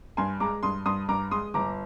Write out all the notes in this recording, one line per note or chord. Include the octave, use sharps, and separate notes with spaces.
G2 G#5 C6
G#3 A#5 D6
G2 C6 D#6
G2 C6 D#6
G2 A#5 D6
G#3 C6 D#6
G1 A#5 D6